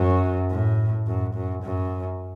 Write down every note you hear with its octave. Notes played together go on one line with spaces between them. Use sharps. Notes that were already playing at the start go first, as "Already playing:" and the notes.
Already playing: F#2
A2
F#2
F#2
F#2